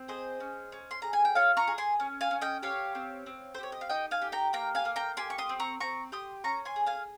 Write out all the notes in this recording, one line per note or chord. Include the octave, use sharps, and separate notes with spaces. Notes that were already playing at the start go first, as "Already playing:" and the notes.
Already playing: C4
G#4 C5 D#5
C#4
C#4
C6
G#4 A#5
G#5
G5
F4 C#5 F5
A#5 C#6
G#4
G#5 C6
C#4
F5 G#5
C#4
D#5 G5
G4 C#5 F5
C4
C4
C5
G4 C#5
D#5
F5
D#4 D#5 G5
F5 G#5
G4
G5 A#5
A#3 G5 A#5
F5 G#5
A#3
G5 A#5
G4 G#5 C6
C#6
C6 D#6
C4
A#5 C#6
C4 A#5 C#6
G4 C6 D#6
C#4 A#5 C#6
G#5 C6
G#4
F5 G#5